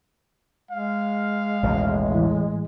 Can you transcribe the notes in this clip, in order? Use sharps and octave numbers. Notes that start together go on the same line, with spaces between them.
G#3 F5
A1 D#2 B2
A2 E3